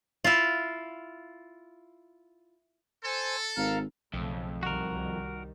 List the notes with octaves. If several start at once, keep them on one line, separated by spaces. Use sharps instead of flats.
E4 F4
A4 C5 G#5
G#1 A#4 F5
B1 F2 C#3 A3
C2 D#3 G3 F#4 A#4